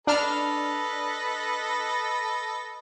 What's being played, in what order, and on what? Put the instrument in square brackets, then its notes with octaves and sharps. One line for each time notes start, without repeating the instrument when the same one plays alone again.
[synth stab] D4 F6 [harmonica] A4 B4 D#5